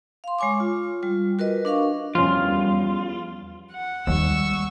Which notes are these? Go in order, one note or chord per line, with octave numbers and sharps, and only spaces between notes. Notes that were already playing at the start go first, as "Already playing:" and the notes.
F5 C6
G#3 C#5 G#5 C#6 D6
F4
G3 F4
F#4 A#4 B4 D#5
D4 A#4 F5 C#6
E2 F3 G3 C#4 F4
F#5
D#2 G3 G#3 C#6 E6